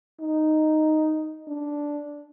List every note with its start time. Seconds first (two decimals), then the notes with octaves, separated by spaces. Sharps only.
0.20 D#4
1.48 D4